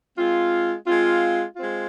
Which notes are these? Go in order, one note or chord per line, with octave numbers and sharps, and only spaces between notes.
G#3 C4 F4
G#3 C4 F4
G#3 C4 F4